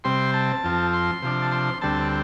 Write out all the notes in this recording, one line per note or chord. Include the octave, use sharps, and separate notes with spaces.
C3 G3 C4 C6
A5
F2 F3 C4
C6
C3 F3 D4
A5
C6
D2 D3 G3 C4 A5